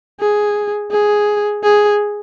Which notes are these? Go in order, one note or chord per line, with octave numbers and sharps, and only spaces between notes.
G#4
G#4
G#4